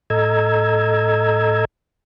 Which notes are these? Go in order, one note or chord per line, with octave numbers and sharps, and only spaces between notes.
A2 A4 D#5 A#5 E6 G#6